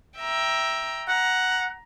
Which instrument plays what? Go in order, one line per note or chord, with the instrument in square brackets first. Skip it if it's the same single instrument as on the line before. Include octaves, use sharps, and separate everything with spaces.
[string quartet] E5 G5 A#5
[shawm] F#5 [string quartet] A#5